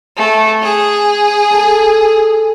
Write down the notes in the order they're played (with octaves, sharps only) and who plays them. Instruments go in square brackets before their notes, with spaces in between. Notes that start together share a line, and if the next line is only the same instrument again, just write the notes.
[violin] A3
G#4
[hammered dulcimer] A4 A5